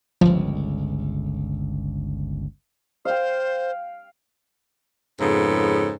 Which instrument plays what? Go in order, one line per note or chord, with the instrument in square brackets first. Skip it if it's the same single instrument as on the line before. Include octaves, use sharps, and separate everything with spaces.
[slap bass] G1 C#2 [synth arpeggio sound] F3
[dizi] C5 [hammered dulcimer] F5 G5
[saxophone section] F2 G#2 C#3 B3 A4